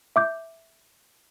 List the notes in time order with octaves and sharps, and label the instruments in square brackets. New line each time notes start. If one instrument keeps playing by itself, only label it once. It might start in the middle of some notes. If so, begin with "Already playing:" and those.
[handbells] E5 D6 G6